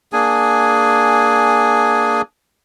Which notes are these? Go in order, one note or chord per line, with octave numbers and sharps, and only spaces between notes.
A#3 D4 G#4 G#5